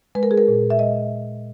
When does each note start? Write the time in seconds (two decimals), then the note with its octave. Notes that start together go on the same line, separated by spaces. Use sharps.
0.15 G#3 B4
0.23 A#4
0.31 G#4
0.38 A#4
0.48 A#2
0.70 E5
0.79 G#3 D#5